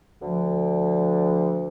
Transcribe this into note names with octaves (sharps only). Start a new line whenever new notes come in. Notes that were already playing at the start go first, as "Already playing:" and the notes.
D2 D3 F3